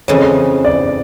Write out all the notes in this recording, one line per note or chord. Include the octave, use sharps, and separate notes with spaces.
F2 C#3 E3 G#3 C#5
D5